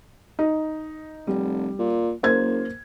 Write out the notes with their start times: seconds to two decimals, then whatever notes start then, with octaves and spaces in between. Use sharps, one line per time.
0.39 D#4
1.27 F1 G3
1.79 A#2
2.23 F#1 A#3 C5 G#6